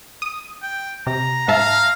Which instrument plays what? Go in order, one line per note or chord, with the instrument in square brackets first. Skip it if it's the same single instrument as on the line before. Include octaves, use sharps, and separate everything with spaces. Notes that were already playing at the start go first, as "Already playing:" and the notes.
[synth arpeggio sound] D#6 D#7
[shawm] G5
[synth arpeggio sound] C3 [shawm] A#5
[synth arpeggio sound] G#2 E5 A5 [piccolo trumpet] F5